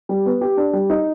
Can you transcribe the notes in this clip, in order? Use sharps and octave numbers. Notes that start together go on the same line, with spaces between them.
G3
B3
G4
D4
G3
D#4